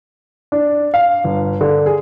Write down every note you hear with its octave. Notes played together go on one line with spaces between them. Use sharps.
D4
F5
G1
D3
G#4